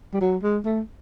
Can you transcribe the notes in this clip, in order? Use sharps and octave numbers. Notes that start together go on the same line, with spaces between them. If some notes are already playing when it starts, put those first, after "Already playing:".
G3
F#3
G#3
A3